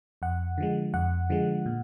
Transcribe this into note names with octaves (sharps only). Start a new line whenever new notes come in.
F2 F#5
D3 F3 G#3
F2 F#5
D3 F3 G#3
A#2